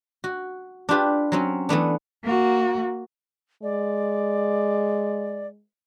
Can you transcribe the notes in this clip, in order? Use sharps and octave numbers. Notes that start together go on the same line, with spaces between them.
F#4
D4 F4 G4 B4
F#3 C4 C#4
E3 A3 B3 D4
A#3 F#4
G#3 D5